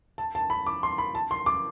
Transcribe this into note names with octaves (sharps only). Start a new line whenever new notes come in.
A5
A5
B5
D6
C6
B5
A5
C6
D6